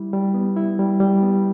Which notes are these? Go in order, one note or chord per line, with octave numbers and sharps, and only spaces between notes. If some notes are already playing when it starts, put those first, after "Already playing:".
Already playing: G3 E4
G3
B3
E4
G3
G3
B3